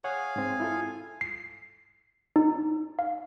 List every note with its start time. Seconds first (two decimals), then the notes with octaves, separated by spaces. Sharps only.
0.04 G#4 C#5 F5 F#5 G#5
0.36 G#2 C4
0.60 E4 F4 A4
1.21 C7
2.36 D#4
2.99 F5